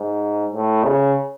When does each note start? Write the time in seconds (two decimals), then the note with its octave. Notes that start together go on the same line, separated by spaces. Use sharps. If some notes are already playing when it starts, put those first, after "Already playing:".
Already playing: G#2
0.53 A2
0.84 C#3